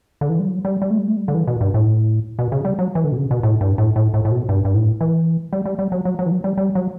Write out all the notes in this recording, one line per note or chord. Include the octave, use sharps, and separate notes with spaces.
D3
E3
G3
F#3
G3
G3
A3
G3
A3
G3
D3
E3
B2
G2
A2
B2
C#3
G3
F#3
E3
D3
B2
C#3
B2
A2
G2
A2
A2
A2
A2
B2
G2
G2
A2
E3
G3
G3
G3
F#3
F#3
F#3
E3
F#3
G3
G3
F#3